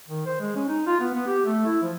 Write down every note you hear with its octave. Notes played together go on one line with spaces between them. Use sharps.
D#3
C5
G#3
C#4
D#4
F4
B3
B3
G4
A3
E4
F3